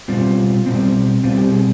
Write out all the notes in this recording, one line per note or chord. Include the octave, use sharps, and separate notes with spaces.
B2 G3 C4 F4
B2 G3 C4
B2 G3 C4 F4
G4
G#4